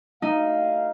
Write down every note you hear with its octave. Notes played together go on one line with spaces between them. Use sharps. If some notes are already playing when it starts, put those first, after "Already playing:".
A3 D#4 F#4 F5